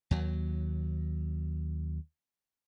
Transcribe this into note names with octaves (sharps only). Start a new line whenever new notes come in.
D#2 F#3